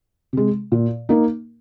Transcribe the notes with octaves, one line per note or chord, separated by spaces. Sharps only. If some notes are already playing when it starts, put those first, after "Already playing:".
C3 G#3
A#2
A#3 D#4 A#4